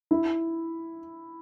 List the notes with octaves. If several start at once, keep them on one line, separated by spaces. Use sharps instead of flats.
E4